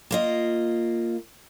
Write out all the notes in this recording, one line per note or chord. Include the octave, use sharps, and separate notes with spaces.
A#3 F4 D#5